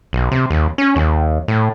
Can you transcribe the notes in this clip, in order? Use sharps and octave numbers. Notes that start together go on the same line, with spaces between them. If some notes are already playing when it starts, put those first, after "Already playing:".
B1
C3
D#2
C#4
D#2
A2